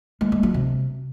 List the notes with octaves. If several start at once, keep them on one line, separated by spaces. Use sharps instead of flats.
G#3
G#3
F#3
C3